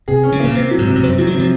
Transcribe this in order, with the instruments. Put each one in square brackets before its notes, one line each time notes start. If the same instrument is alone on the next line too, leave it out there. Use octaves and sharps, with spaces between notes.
[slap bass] C3 [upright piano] G#4
[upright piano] C#4
[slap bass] C#3
[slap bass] A#2 [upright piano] A#3
[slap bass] C3 [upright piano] C4
[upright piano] F#3
[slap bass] G#2
[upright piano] C3
[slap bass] G#2
[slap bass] F#2 [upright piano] C4
[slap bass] F3 [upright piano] F#3
[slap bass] D#3
[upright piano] C3 [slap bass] F3